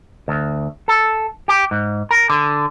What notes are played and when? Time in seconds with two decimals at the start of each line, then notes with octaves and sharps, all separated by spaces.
0.28 D2
0.88 A4
1.48 G4
1.71 G#2
2.11 A#4
2.30 D3